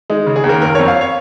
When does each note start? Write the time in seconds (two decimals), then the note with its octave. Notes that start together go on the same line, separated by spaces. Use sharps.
0.10 G#3 D#4
0.26 C#3
0.36 G#4
0.44 D#2
0.49 A#4
0.62 F#1 A#4
0.75 F2 C#5
0.88 F5
1.01 C#5